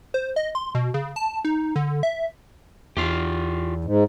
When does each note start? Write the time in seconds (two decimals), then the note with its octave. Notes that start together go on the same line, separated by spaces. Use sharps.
0.14 C5
0.36 D#5
0.55 C6
0.75 B2
0.94 C#3
1.16 A5
1.45 D#4
1.76 D3
2.03 E5
2.97 E2 F4 G4
3.85 G#2